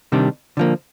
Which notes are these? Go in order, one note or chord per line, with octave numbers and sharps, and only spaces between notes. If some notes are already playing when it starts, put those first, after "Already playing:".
C3 D#3 G3 D4
D3 F3 A#3